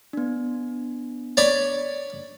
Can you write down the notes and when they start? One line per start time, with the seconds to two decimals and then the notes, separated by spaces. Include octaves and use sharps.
0.13 B3 D4
1.37 C#5 D5 B5